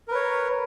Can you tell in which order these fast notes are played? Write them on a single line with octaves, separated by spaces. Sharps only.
A#4 B4 C#5